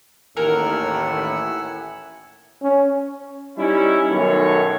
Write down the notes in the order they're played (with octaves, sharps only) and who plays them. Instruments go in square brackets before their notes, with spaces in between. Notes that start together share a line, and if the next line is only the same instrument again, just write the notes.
[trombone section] A1 D#2 [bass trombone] A2 [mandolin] A#4 [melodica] F#5 G#5 E6
[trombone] C#4
[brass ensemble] G3 C#4 D#4 E4
B1 F#2 D#3 A3 A4 C#5